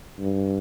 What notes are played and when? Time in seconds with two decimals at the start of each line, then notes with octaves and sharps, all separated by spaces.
0.19 G2